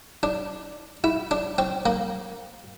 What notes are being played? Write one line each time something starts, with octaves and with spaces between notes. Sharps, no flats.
D4
E4
D4
C4
A#3